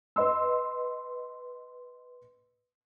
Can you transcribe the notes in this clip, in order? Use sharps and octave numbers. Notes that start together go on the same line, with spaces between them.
B4 D#5 C6 E6